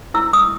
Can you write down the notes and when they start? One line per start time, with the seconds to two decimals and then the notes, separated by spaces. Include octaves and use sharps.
0.14 E4 E6
0.33 D#6